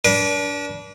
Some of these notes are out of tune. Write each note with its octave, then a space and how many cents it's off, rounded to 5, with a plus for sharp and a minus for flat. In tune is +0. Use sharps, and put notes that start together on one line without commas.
D4 -25 B4 -45